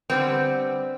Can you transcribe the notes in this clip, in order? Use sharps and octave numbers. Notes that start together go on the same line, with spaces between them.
D3 G3 B3 C4